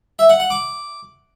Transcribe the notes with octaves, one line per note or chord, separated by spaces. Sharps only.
E5
F#5
F#5
D6